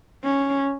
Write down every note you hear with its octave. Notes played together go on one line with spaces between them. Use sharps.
C#4